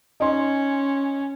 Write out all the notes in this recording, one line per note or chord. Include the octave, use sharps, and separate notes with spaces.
C#4 D#4 C6